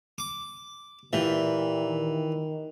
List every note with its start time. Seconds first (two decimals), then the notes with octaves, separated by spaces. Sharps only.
0.18 D6
1.13 A#2 E3 F4 G4 E5
1.82 D#3